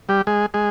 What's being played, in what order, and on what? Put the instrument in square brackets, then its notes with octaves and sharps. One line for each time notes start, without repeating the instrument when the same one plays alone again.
[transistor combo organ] G3 G4
G#3 G#4
G#3 G#4